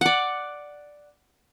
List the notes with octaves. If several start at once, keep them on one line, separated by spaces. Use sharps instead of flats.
D5 F#5